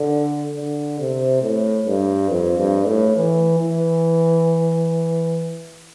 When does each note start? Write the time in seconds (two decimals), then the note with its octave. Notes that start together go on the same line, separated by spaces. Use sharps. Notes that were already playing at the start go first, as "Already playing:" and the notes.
Already playing: D3
0.56 D3
1.00 C3
1.42 A2
1.87 G2
2.30 F2
2.58 G2
2.87 A2
3.17 E3
3.59 E3